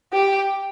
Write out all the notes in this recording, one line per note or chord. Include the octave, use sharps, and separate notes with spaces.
G4